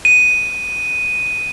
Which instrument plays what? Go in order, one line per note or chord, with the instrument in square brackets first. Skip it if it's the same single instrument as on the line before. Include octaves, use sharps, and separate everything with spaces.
[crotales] D#7